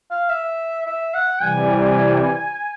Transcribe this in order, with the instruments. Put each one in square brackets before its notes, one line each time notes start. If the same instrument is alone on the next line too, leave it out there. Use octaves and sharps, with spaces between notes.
[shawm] F5
E5
E5
F#5
[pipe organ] C3 E3 G3 [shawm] G#5